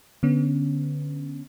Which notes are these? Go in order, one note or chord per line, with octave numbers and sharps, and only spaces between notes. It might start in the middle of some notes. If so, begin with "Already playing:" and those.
D3 B3 C#4